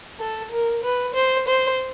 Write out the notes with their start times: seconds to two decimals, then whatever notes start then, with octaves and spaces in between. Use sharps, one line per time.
0.19 A4
0.51 A#4
0.83 B4
1.15 C5
1.48 C5